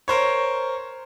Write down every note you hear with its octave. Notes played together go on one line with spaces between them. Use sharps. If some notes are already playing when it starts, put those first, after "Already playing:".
A#4 C5 C#5